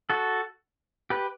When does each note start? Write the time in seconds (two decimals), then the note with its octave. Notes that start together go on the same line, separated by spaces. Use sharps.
0.10 F#4 A4
1.10 G4 B4